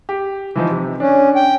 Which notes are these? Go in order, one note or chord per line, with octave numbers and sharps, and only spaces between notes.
G4
E3 F3 D#4
C3
C#4 D4
G5